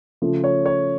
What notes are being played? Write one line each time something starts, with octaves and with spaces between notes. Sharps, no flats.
C#3 F3 A3
C#5
C#5